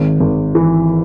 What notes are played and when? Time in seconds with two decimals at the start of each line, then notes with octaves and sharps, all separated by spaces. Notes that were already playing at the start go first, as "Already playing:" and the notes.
Already playing: G#1
0.20 G#1
0.55 E3